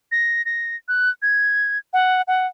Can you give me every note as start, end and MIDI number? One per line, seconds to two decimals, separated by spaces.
0.12 0.44 94
0.45 0.76 94
0.88 1.10 90
1.22 1.78 92
1.93 2.22 78
2.28 2.47 78